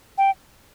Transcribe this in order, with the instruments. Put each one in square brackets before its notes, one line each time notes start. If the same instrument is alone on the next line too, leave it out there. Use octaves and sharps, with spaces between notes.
[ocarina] G5